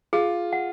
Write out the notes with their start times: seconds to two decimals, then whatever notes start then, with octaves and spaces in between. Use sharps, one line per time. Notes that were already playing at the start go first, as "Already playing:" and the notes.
0.13 F4 G#4
0.53 F#5